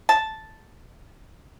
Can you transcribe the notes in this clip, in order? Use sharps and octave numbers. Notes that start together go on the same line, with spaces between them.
A5